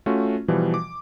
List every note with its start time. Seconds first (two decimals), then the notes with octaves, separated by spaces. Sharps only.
0.06 A3 C#4 F4 F#4
0.48 B2 E3 F3 G3
0.74 D6